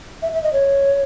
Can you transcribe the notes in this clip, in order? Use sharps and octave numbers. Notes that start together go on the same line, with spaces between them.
E5
E5
D#5
C#5